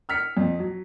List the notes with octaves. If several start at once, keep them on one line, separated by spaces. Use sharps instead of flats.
E6 F6 B6 C#7
F2
F#3